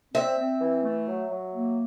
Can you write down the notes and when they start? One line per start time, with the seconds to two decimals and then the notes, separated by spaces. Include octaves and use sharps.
0.13 C4 E5
0.38 C4
0.60 E3
0.83 A3
1.07 F#3
1.29 F#3
1.52 A#3